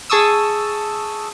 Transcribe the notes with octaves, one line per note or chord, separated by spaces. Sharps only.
G#4 A5 C#6 D#6 E6